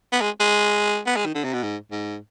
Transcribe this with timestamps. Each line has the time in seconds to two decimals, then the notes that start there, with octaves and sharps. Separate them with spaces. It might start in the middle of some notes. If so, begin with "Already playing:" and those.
0.13 B3
0.21 G#3
0.40 G#3
1.07 B3
1.16 G#3
1.26 D#3
1.35 D3
1.44 C3
1.54 B2
1.64 G#2
1.92 G#2